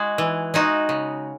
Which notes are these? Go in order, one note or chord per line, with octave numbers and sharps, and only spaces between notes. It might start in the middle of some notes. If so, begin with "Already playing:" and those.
Already playing: G#3 F#4
E3
G#3 D#4 F#4
C#3